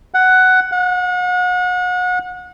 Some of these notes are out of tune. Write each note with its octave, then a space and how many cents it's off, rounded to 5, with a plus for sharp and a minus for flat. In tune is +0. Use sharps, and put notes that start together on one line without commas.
F#5 +10
F#5 -35